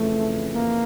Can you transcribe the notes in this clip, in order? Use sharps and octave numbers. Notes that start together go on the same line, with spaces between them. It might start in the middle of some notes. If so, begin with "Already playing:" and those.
Already playing: F2 C#3 E3 A3
A#3